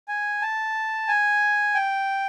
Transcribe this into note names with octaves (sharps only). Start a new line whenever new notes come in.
G#5
A5
G#5
G5